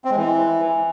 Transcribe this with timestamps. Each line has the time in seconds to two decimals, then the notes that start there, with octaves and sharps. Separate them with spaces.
0.05 C4
0.11 G#3
0.17 E3